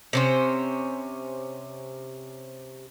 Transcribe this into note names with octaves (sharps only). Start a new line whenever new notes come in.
C3 C#4 C5